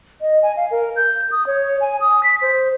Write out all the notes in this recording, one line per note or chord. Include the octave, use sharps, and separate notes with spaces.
D#5
G#5
F5
A#4
G6
D#6
C#5
G#5
D#6
B6
C5